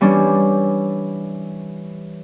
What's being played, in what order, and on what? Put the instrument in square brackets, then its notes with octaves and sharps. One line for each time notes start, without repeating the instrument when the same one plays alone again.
[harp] E3 G3 C#4 D4